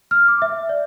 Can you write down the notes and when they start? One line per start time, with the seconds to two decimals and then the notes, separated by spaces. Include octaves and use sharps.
0.11 F6
0.28 D6
0.42 E5
0.69 D5